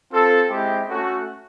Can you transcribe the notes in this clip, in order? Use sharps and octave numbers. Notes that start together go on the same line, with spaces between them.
C4 F4 A4
G#3 C4 E4 G4
A3 C#4 F#4 A4